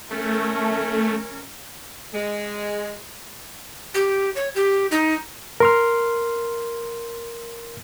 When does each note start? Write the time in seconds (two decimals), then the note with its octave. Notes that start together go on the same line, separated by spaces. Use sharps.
0.11 A3 C#4 A#4
2.14 G#3
3.94 G4
4.35 C#5
4.55 G4
4.91 D#4
5.60 A#4 C6 F6